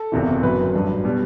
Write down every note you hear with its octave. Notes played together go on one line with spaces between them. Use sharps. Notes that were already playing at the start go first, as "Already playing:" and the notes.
Already playing: A4
F#1 E2 C3 E3
G1 F#2 F#3 B4
A1 G2 F#3
B2 G3